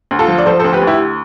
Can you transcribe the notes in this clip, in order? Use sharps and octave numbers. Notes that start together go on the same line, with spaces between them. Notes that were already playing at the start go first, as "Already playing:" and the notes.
D2
F4 A4
F3
D5
F3 A4 C5
D2 A4 C5
G4 B4
D2
E4 G4